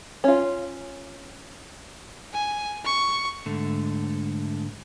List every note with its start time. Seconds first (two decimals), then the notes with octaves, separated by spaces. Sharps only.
0.24 C#4 F4
2.33 G#5
2.85 C#6
3.46 G#2 D3 A3